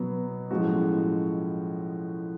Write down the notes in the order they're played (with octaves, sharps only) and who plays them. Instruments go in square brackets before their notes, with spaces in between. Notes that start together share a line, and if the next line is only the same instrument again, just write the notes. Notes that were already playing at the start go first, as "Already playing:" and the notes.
Already playing: [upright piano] B2 F#3 B3
A2 F3 G#3 C#4 F#4